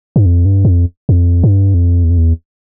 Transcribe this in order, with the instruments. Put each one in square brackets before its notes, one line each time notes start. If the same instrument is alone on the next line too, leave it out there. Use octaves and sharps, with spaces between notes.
[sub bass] G2
F2
G2
F2
E2
F2
G2
F2
E2
F2
E2